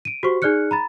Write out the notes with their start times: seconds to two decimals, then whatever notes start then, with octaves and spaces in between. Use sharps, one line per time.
0.05 D7 D#7
0.23 F#4 G4 C5 C#6
0.42 D#4 G#4 D5 F6 F#6 C#7
0.71 A#5 B5 A6